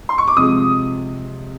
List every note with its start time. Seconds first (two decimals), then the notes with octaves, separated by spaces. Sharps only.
0.09 C6
0.18 C#6
0.28 D6
0.37 C3 F3 G#3 D#6